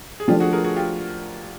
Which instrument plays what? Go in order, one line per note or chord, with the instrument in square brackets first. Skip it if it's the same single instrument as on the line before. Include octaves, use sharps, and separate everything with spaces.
[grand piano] G#4
[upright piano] F3 A3 D4 [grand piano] F4 G4
[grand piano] F#4 G#4
G#4 A#4
F#4 G#4
F4 G4